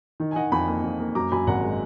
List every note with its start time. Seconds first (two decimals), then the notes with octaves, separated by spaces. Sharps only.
0.20 D#3
0.31 G#5
0.36 D#3 D#5 F#5
0.51 F2 G#5 B5
0.68 A#3
0.83 F2
1.00 A#3
1.15 F#2 A#5 D6
1.32 F#2 G#5 B5
1.47 G#1 F#5 A#5
1.64 G#3